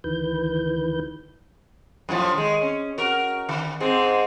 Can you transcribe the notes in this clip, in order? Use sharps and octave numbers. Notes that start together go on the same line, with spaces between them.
D2 D#3 E3 B4 G6
F#2 A2 F3
D#3 G#3
C#4
F#4 A#4
D3 D#3
G#2 G#3 C4